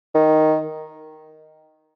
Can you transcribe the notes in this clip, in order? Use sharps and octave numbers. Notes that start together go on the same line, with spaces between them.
D#3